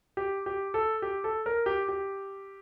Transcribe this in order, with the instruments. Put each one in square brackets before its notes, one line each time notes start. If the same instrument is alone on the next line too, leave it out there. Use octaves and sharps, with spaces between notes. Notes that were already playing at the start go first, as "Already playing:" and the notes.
[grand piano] G4
G4
A4
G4
A4
A#4
G4
G4